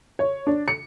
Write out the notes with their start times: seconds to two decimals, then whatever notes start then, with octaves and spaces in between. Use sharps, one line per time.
0.19 C#5
0.47 D4
0.68 C#7